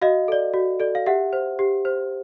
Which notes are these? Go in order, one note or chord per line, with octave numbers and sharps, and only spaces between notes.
F#4 D#5 F5
A4 D5
F#4
A4 D5
F5
G4 E5 F#5
C5
G4
C5